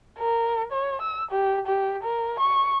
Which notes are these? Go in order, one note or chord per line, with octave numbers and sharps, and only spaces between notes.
A#4
C#5
E6
G4
G4
A#4
C#6